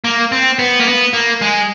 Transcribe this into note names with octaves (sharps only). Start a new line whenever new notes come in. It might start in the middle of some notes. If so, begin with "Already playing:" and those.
A#3
C4
B3
A#3
B3
A#3
G#3